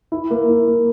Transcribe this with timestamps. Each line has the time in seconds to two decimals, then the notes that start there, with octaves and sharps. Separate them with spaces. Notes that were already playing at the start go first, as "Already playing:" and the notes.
0.12 E4
0.31 A#3
0.49 E4
0.67 A#3